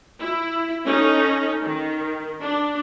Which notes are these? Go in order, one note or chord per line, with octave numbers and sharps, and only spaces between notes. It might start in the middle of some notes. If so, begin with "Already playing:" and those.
E4
C#4 D#4 A4
D#3
D4